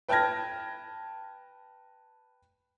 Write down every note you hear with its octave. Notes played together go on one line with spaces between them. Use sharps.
B4 G5 A5 F6 G#6 A#6